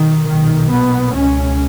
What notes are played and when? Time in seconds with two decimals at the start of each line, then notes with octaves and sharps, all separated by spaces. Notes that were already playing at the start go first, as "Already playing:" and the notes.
Already playing: B2 D#3
0.29 B1 A#2 D#3
0.72 B3
1.14 C#2 B2 C#4